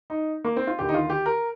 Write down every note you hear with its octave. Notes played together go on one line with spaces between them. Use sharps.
D#4
A#3
C4
F4
D#2 D3 G4
D#4
F4
G4
A#4